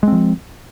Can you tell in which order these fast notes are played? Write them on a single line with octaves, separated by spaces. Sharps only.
G#3 C4 F3